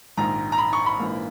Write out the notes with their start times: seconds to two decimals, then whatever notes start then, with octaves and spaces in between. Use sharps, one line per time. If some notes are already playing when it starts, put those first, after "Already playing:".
0.17 A#1 G#2 D#3 A#5
0.52 A#5
0.58 B5
0.73 C#6
0.86 B5
0.99 A#1 G#2 E3 A#3